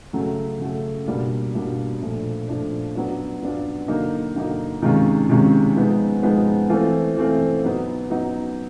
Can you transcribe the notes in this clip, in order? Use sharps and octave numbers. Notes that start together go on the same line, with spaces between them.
C#3 F#3 A3
C#3 F#3 A3
B2 G3 A#3 D4 F4
B2 G3 A#3 D4 F4
A#2 F3 A3 D4
A#2 F3 A3 D4
F#3 B3 D4 F4
F#3 B3 D4 F4
D3 F#3 A#3 D#4
D3 F#3 A#3 D#4
C3 D#3 G#3 C#4 F4
C3 D#3 G#3 C#4 F4
F3 G#3 B3 D#4
F3 G#3 B3 D#4
E3 A3 C4 F4
E3 A3 C4 F4
F#3 B3 D#4
F#3 B3 D#4